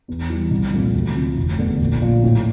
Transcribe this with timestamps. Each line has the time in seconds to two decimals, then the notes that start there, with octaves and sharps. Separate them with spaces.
0.08 E2
0.30 E3 G3
0.51 C2
0.73 A#2 F3 A3 C4
0.94 D2
1.16 C3 F3
1.38 F1
1.58 E2 D3 A3
1.81 A#1
2.02 A#2 F3
2.24 A2